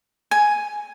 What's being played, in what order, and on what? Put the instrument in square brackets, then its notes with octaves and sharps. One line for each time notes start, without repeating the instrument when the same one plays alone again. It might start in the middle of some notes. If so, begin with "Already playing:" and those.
[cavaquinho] G#5